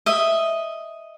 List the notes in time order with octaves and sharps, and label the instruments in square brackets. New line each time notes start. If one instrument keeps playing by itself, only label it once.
[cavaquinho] D#5 E5